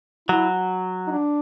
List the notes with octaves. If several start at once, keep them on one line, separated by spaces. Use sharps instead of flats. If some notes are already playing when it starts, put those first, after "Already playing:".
F#3 E4
D#4
D4